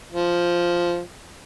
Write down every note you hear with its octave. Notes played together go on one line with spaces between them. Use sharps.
F3